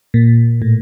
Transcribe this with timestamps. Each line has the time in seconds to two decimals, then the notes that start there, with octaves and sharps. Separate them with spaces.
0.14 A#2
0.62 A2